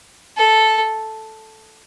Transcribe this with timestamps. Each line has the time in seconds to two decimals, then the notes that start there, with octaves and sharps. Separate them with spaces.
0.37 A4